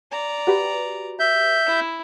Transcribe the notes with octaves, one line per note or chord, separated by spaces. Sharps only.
D5 A#5
F#4 G4 B4
E5 G6
E4